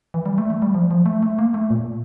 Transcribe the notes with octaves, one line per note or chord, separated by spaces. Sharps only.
E3
G3
A3
A3
G3
F3
F3
A3
A3
A#3
A3
A#2